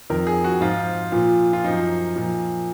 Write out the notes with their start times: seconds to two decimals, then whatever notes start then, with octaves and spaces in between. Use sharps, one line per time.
0.10 F2 D#3 A#4
0.27 G#4
0.44 F#4
0.60 G#2 F3 F4
1.12 A#2 F3
1.53 F4
1.64 F#2 F3 D#4
2.16 A#2 F3